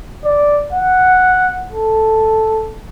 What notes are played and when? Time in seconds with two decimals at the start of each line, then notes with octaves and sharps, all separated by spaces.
0.25 D5
0.73 F#5
1.72 A4